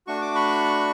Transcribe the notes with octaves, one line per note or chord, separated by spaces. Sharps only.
A3 D4 F#4 C#6
D6
B5 C#6